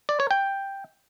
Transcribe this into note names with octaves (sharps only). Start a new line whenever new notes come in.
D5
C#5
G5